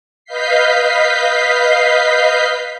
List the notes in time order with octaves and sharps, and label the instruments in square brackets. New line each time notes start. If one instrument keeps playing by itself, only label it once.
[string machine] B4 D#5 F5 G6 B6 C7